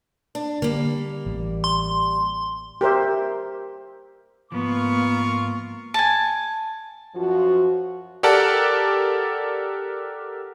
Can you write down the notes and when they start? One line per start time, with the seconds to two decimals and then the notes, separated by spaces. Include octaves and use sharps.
0.35 D4
0.62 D3 G3 A#3
1.26 A1
1.64 C6
2.81 G4 A#4 C5 E5
4.52 G#2 F3 A#3 B3 F4 A#4 C#6
5.94 G#5 A5
7.16 F#2 F3 F4 F#4
8.23 G4 A4 A#4 D5 F#5 A5